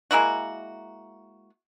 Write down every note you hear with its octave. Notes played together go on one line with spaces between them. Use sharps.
G#3 A#3 E4 F#4